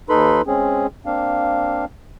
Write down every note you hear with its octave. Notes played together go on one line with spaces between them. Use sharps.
D#2 D#4 A4 B4 B5 C6
G#3 C4 C#4 G#4
A#3 C4 D4 F5